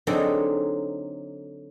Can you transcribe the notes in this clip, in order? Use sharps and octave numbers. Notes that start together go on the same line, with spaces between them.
D3 F#3 C4 D#4 G#4 A4